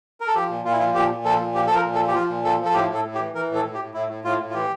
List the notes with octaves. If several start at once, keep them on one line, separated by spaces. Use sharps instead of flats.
A#4
A4
F3 G4
A#2
A#2 F4
E4
F3 F4
A#2 G4
A#2
F3 A4
A#2
F3 G4
A4
F3 A#4
A#2
A4
F3
G4
F3 F4
A#2
F3 A4
F3
A4
A2 G4
A2 A4
A2
G4
E3
E3 A#4
A2
A4
A2
G4
A2
A2 E4
A2
A2 F4
A2
F4
E3 G4